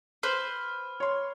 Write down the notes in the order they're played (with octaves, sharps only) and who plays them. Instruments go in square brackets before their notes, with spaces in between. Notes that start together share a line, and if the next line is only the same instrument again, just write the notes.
[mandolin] B4 C5 [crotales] F6
[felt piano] C#5 C6